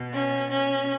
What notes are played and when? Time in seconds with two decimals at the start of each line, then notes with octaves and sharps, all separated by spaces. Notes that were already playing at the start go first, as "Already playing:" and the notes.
Already playing: B2
0.13 C#4
0.51 C#4